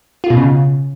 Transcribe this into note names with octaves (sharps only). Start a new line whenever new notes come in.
F4
B2
C#3